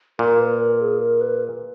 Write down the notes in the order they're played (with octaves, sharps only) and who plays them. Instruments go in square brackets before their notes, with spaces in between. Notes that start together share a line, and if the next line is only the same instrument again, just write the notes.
[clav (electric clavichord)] A#2 [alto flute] A#4
[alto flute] B4
A#4
G#4
A#4
B4